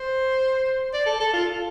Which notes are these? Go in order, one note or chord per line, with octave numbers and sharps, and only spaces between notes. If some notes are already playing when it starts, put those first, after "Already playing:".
Already playing: C5
D5
A4
A4
F4